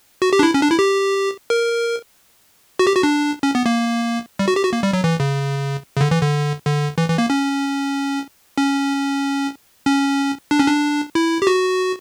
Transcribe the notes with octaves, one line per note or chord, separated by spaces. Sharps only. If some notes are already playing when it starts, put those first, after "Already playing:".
F#4
G4
D4
E4
C#4
D4
E4
G4
A#4
F#4
G4
F#4
D4
C#4
B3
A#3
G3
F#4
G4
F#4
A#3
G3
F#3
E3
C#3
C#3
D3
E3
D3
D3
E3
E3
A#3
C#4
C#4
C#4
D4
C#4
D4
E4
G4
F#4